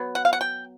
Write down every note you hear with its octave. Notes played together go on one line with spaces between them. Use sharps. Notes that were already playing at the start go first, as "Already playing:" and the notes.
Already playing: F#3 B3
F#5
F5
F#5
G5